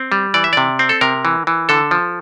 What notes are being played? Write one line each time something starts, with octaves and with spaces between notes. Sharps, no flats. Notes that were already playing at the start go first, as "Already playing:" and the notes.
Already playing: C4
G3
E3 D5
E5
C3 D5
C4
A4
C3 A#4
E3
E3
D3 A4
F3